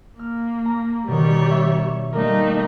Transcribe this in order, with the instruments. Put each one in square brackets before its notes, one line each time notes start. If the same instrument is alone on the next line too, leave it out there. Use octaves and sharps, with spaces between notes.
[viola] A#3 [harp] F6
[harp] A#5
[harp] B2 D#3 [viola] G3 C#5
[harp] E5
[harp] G3 A#3 A#4 [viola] A3 D#4